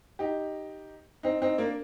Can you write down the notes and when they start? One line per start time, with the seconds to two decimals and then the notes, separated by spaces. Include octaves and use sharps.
0.19 D#4 G4
1.23 C4 D#4
1.42 C4 D#4
1.58 A#3 D4